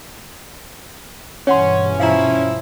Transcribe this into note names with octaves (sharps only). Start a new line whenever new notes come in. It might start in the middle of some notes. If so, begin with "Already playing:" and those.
G2 B2 E3 C#4 C#5 F#5 C6
F3 E4 F5 A#5